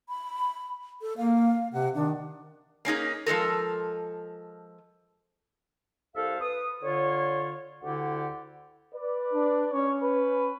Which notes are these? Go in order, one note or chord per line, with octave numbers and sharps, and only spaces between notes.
B5
A4
A#3 F5
C3 F#5
D#3 D4
A#3 C#4 D#4 G#4
F3 G#3 A4 A#4
C2 A4 C5 E5 F5
B4 D#6
D3 F4 C#5
D2 D3 E4 G4 D5 F#5
B4 D5
D4
C#4 C#5
B4